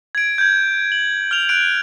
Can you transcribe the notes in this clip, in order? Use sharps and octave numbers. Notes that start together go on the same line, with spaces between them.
G#6 D7
G6 G#6
F#7
F6 F7
F#6 D7